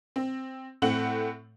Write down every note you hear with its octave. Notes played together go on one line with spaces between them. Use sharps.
C4
A2 A3 C4 F#5 F#7